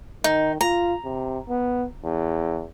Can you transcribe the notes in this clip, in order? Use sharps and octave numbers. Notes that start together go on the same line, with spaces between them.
D#3 D#4
F4 A#5
C3
B3
E2